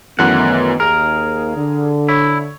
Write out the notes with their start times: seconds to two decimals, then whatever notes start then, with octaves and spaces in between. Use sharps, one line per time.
0.19 F#2 D#3 E3 A3 B3 F#5
0.80 D#2 G#4 A#4
1.57 D3
2.09 E4 C#5